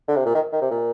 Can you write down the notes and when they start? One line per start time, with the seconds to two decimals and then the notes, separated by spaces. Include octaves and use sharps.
0.08 D3
0.16 C3
0.26 A#2
0.35 D#3
0.52 D#3
0.61 C3
0.71 A#2